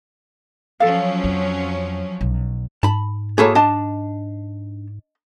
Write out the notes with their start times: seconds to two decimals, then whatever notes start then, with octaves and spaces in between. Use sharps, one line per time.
0.80 F3 F#3 C#4 A4 F5
1.24 F2
2.21 B1
2.83 G#2 A5 B5
3.38 A#3 E4 F#4 G#4 A4 C#5
3.55 D4 D#5 A5